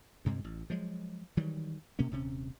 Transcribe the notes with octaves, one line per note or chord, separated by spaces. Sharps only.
D2 G2 C3 G#3
A1
F3 F#3 G#3
D#3 E3 F#3 G3
B2 A#3 C#4
D#1 C3 C#4